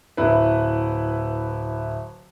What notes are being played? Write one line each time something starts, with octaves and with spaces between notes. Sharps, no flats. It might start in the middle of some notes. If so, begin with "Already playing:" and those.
D1 E4 B4